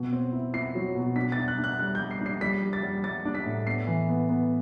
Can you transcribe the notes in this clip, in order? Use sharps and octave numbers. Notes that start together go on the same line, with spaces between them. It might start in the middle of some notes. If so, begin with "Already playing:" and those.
Already playing: B2
C4
E4
E4 C7
F#3
B2
D4 B6
A6
D4
F#6
D4
F#6
G3 F#6
G3 G6
C7
D4 C7
G3 B6
G3
A6
G3
G3 A6
D4
B6
A2
B3 C7
E3
B3
B3